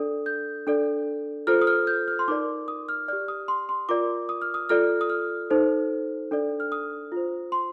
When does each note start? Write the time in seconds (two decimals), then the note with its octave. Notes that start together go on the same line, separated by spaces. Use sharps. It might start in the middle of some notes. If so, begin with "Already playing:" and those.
Already playing: D4 A4 D5 D#6
0.26 G6
0.67 D4 A4 D5
1.47 F4 A4 C5 F6
1.61 D#6
1.67 F6
1.87 G6
2.08 F6
2.19 C6
2.28 D#4 A#4 D5 D6
2.68 D#6
2.89 F6
3.08 G4 D5 F6
3.28 D#6
3.48 C6
3.69 C6
3.89 F4 A#4 D5 D6
4.29 D#6
4.42 F6
4.54 D#6
4.69 F4 A4 D5 F6
5.01 D#6
5.10 F6
5.50 D#4 A4 C5
6.31 D4 A4 D5
6.60 F6
6.72 D#6
7.12 F4 C5
7.52 C6